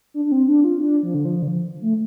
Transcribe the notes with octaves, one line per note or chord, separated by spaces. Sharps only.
D4
D4
C4
D4
F4
D4
F3
D3
F3
D3
F3
A3